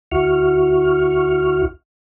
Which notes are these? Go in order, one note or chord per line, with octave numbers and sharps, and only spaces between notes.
D2 E4 F#4 C#6 F6